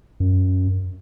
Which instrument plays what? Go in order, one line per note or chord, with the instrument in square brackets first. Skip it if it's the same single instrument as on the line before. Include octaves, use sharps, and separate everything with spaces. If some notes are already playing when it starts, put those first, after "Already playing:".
[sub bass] F#2